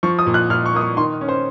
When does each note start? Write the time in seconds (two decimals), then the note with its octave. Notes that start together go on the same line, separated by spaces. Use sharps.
0.03 F3 C#6
0.19 D#6
0.27 A#2
0.34 F#6
0.50 A#2 F6
0.66 C#6
0.74 A#3 D#6
0.81 C#6
0.97 D#3 C6
1.21 C#4
1.29 C5